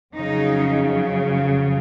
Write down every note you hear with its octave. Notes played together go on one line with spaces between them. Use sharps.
F2 C#3 F#3 D#4